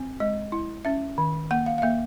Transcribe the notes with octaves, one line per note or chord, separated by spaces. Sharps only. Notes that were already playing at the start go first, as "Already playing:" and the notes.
Already playing: C4
G#3 D#5
E4
C#4 E5
D#3
A#3 F#5
F5
F5
A#3 E5